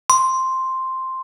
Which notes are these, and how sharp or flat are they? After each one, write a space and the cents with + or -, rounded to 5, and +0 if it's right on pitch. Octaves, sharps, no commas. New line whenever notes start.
C6 +0